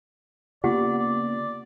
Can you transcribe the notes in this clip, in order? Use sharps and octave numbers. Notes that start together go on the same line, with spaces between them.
C#3 A#3 B3 F4 G4 D5 F#5
D5